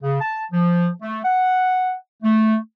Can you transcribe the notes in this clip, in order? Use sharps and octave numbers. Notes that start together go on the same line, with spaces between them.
C#3
A5
F3
A3
F#5
A3